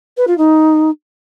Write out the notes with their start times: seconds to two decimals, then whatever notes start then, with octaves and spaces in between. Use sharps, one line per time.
0.17 B4
0.28 F4
0.38 D#4